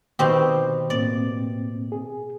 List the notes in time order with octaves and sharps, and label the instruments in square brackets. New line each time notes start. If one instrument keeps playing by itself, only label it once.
[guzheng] B2 C4 G4 [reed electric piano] D#3
[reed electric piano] A2 A#3 C4 [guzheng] D5
[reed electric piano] G#4